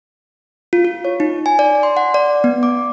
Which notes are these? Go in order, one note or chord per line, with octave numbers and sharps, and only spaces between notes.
F4
F4
C#5
D#4
G#5
D5
C6
F#5
D5
B3
D6